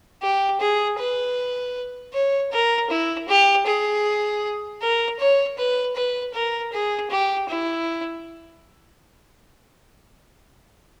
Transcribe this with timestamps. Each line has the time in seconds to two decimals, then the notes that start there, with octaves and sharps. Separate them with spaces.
0.22 G4
0.60 G#4
0.99 B4
2.13 C#5
2.52 A#4
2.90 E4
3.28 G4
3.66 G#4
4.81 A#4
5.19 C#5
5.58 B4
5.96 B4
6.34 A#4
6.72 G#4
7.10 G4
7.49 E4